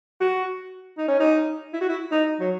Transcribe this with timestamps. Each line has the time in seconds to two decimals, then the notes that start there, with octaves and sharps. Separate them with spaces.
0.20 F#4
0.98 D#4
1.08 C#4
1.20 D#4
1.73 E4
1.81 F#4
1.89 E4
2.12 D#4
2.40 F#3